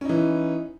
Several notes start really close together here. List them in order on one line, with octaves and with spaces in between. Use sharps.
C#4 D#4 E3